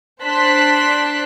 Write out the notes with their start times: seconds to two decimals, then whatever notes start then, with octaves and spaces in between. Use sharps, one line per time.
0.23 D4 C5 A5 C6 F#6 B6